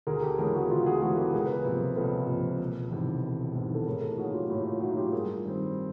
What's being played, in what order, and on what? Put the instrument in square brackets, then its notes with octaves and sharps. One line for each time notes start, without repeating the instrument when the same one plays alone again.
[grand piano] D2 [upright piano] G#4 A#4
[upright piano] G4 A4
[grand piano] C#3 E3 G#3 B3 [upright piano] G#4 A#4
[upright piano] F#4 G#4
[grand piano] D2 [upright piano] F4 G4
[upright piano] F#4 G#4
[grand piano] C#3 E3 G#3 B3 [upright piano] F#4 G#4
[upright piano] G4 A4
[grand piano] C#2 [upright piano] G#4 A#4
[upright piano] B4
G#4 A#4
[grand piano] C3 F3 A#3
[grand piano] C#2 [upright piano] A4 B4
[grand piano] C3 F3 A#3
E1
E2 C3 D#3
E1
E2 C3 D#3
[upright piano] A4
[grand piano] A2 [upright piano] G#4 A#4
[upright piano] G4 A4
[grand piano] F#3 A#3 D#4 [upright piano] F#4 G#4
[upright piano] F4 G4
[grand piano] A2 [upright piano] F4 G4
[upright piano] F4
[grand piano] F#3 A#3 D#4 [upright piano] E4 F#4
[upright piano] F4 G4
[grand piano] G2 [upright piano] G#4 A#4
[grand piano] D#3 G3 C4